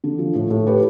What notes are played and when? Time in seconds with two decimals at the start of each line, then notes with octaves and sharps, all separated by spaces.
0.04 D3
0.19 F3
0.35 A2
0.51 A2
0.67 G4 B4